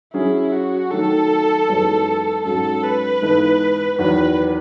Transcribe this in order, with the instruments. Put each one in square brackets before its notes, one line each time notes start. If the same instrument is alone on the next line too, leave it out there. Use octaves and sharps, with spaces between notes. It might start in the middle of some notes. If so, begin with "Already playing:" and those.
[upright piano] F#3 C#4 G#4 [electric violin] E4
[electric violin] F#4
[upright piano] D#3 F#3 A3 [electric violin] A4
[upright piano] F#2 E3 G#3 B3 D#4
[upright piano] G#2 F#3 C#4 F#4 [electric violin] A4
[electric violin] B4
[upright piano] G#2 E3 B3 D#4 A4
[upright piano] E2 D#3 F#3 [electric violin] B4